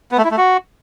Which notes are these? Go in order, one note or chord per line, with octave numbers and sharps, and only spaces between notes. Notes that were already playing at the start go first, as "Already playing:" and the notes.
B3
A3
E4
A3
F#4